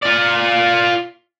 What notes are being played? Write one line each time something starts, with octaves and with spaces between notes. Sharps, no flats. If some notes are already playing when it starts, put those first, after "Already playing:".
F4 D5